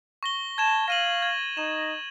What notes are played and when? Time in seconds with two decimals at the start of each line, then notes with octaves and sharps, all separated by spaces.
0.23 C#6 A#6 G7
0.58 A5 G#6 E7
0.88 F5 A#6 D#7 F#7
1.22 G#6
1.57 D#4 E7